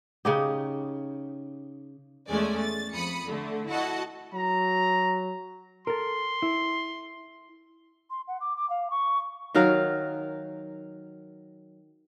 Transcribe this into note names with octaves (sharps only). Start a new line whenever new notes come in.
C#3 D#4 G4
E2 G#3 A3 C#4 D5 G#5
A6
F2 B5 D#6 C#7
D3 A3
E4 F#4 D#5 F#5 A5
F#3 A#5
A4 A#4 C6
E4
C6
F#5
D6
D6
F5
C#6
D#3 F#3 A#4 F5